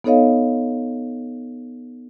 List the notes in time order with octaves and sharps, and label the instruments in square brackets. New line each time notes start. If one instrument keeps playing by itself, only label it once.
[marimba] B3 D#4 A4 C#5 D#5 F5